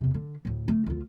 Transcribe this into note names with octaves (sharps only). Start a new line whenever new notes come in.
E2 C3
D3
D2 A2
D3 A3
D2 F4